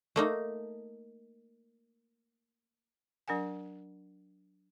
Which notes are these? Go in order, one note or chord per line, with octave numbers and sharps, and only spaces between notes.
A3 A#3 D#4
F#3 D4 A#4 F#5 G#5